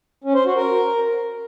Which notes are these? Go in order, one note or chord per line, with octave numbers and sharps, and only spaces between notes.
C#4
C5
F#4
A#4